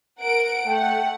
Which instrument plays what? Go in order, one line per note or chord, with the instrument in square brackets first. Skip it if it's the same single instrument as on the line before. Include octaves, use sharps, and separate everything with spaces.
[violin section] A#4 F#5 D7
[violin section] A3 F#5 [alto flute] G5